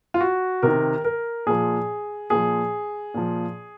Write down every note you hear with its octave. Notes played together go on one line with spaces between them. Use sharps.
F4
F#4
C3 D#3 A#4
A#4
A#2 F3 G#4
A#2 F3 G#4
A#2 F3